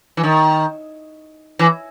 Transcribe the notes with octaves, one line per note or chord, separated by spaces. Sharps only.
E3
D#3
E3